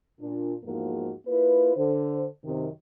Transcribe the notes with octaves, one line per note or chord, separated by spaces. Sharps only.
A#2 D4
E2 G#2 F3 A#3 D#4 F#4
A#3 E4 F4 B4
D3 C5
F#2 C3 D#3